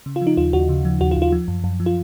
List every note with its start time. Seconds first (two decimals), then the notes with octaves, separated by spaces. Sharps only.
0.06 C#3
0.16 F4
0.22 F3
0.27 D#4
0.37 D#2 F4
0.53 D#2 F#4
0.69 C#3
0.85 F3
1.01 D#2 F#4
1.11 F4
1.17 D#2
1.22 F4
1.32 F3
1.48 F#2
1.64 F#2
1.80 F3
1.86 F4